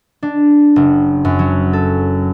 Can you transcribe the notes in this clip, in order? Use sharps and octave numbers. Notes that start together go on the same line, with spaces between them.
D4
F#1
F#2
F#3
A4